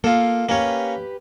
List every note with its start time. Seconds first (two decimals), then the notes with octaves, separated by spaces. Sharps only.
0.04 A#3 F4 A4
0.49 A#3 C#4 G4 B4 C#5